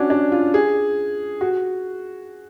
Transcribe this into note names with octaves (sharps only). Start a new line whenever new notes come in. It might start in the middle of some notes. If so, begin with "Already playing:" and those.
Already playing: C#4 D4 F#4
D4
F4
G#4
F#4